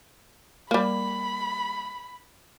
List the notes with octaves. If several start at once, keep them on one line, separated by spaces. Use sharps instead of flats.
G3 A#3 B5